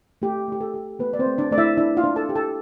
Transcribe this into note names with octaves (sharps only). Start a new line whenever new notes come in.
A3 G4
A3 G4
A4
G4
A3 B3 B4
D5
C4 C5
A3
D4 D5
A3 D5
E4 E5
D4 E4 E5
F4 F5
D4
A4 A5
G4
A4 A5